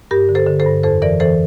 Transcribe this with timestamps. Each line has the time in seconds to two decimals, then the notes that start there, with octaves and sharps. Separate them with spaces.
0.11 G2 G4 A#4
0.29 D3
0.35 A4 C5
0.47 D3
0.60 A4 C5
0.66 G2
0.83 F2 A4 C5
1.02 E3 A#4 D5
1.20 E3 A4 C5